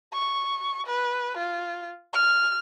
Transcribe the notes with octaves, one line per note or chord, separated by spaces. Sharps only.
C#6
B4
F4
F6